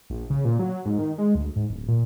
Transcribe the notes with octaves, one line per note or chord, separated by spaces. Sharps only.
A#1
C#3
A#2
F#3
G#2
D#3
G#3
D2
G#2
D1
A#2